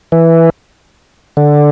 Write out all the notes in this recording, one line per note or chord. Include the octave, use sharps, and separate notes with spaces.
E3
D3